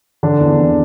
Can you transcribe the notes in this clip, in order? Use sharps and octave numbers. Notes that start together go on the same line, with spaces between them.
D3 D4
E2
D3